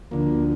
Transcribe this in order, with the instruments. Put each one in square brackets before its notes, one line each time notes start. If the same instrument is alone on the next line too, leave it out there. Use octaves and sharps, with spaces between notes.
[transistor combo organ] D2 D3 F3 A#3